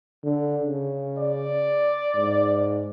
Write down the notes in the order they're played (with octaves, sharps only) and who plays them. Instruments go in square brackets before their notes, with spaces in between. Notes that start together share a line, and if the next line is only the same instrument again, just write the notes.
[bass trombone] D3
C#3
[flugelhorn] D5
[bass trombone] G#2